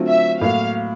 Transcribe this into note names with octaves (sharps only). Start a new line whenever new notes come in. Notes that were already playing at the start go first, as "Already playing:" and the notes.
Already playing: D3 F#3 A3 C4 F4
E5
A2 F#3 A#3 F5